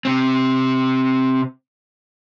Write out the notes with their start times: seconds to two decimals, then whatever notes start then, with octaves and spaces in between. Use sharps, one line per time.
0.05 C3 C4